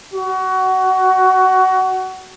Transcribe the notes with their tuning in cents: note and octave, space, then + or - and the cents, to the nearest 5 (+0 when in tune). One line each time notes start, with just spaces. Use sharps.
F#4 +20